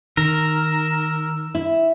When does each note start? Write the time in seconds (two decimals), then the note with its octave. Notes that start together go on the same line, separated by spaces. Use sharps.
0.17 D#3 A#4 E6
1.55 E4